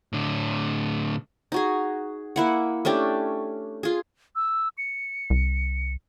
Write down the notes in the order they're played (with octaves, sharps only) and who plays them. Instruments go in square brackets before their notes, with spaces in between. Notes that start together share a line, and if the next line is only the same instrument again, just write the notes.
[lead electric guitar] A2 D3
[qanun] D#4 F#4 G#4
A#3 E4 F#5
A3 C#4 D4 G4
F4 G#4
[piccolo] E6
C#7
[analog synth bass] C2